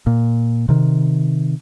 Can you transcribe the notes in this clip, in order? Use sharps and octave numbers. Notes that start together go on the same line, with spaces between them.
A#2
C3 D#3